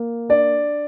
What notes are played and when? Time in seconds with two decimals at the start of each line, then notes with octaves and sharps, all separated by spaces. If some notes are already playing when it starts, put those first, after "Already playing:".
Already playing: A#3
0.29 D4 D5